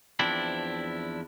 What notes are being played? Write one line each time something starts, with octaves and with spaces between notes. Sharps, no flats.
E2 F3 C4 D4 E4